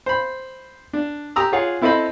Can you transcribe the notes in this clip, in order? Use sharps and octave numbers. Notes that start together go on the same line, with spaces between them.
C5 B5
D4
G4 A#5 D#6 E6
F4 G#4 C#5 F5 F#5
C4 E4 A4 C5 D#5 B5